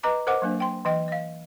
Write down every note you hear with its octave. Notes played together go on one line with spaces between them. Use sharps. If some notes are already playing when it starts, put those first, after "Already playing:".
B4 D#5 A#5 D6
A#4 C5 D#5 F#5 D6
F#3 A#3 D4
G5 C6
E3 D#5 G5
D#5 F5